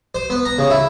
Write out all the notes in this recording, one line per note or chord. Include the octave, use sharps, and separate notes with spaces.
C5
B3
A#5
C#3
E4